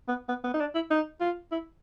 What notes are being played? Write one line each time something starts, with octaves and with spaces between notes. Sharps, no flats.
B3
B3
B3
D#4
D4
E4
D#4
F4
E4